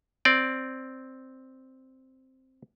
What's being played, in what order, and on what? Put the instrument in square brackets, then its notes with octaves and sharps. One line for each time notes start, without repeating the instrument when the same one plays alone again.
[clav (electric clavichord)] C4 D5